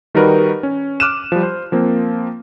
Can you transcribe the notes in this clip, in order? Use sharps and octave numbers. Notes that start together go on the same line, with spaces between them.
D#3 G3 D#4 F#4 A#4 B4
C#4
D6 F6 F#6 D#7 E7
F3 G3
C5
F3 A#3 C4